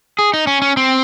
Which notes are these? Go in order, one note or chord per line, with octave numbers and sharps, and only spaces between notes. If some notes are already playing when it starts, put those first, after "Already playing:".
G#4
D#4
C#4
C#4
C4